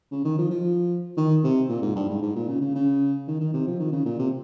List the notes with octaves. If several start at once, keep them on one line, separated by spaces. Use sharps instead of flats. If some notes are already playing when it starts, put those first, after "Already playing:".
C#3
D#3
F3
F3
D#3
C3
A#2
G#2
G2
G#2
G#2
A#2
C#3
C#3
C#3
D#3
D#3
C3
F3
D#3
C#3
A#2
C3